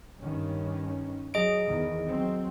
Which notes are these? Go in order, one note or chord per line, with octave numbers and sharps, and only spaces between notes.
G2 D#3 C#4
F#3 G#4 D#5 D7
E2 D#3
F#3 C4